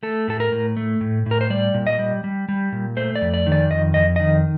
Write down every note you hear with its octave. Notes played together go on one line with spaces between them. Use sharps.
A3 A4
A2 A4
A#4
A2
A3
A2
A2
A#4
C5
G3 D5
A#2
D#5
G3
G3
G3
A#2
A3 C5
D5
F2
D5
D#3
D5
F2 D#5
F2 D#5
D#3 D#5